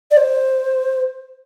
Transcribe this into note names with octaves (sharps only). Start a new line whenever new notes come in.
D5
C5